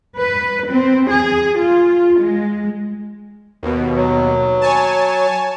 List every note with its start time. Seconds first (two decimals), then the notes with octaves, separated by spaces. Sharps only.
0.16 B4
0.68 C4
1.10 G#4
1.57 F4
2.19 G#3
3.63 D#2 B2
3.96 F#3
4.61 C#5 G#5 A5